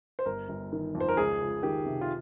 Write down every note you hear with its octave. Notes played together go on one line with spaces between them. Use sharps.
C5
G1 A#4
G1
D#3
F2
C5
A#4
C#2 G#4
C#2
D#3 G4
C3
F4